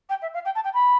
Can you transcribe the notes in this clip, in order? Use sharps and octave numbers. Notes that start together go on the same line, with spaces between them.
G5
E5
F5
G5
A5
G5
B5